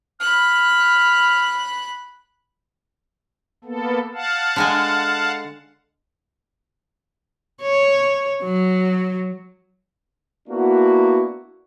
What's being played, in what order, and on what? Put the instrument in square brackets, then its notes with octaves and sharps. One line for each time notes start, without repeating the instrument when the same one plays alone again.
[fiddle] B5 F#6 [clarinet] F6
[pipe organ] A#3 B3 A4
F5 F#5 A5
[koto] D3 G#3 G#5
[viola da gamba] C#5
F#3
[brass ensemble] A#3 B3 D4 E4 F#4